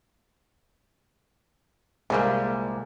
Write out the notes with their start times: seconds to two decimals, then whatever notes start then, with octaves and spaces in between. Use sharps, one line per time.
2.10 C2 A#2 D3 G3 G#3 A#3 D4 G#4